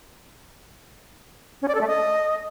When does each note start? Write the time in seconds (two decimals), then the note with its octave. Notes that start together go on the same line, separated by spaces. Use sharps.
1.62 C#4
1.68 D5
1.75 A4
1.81 A3
1.88 D#5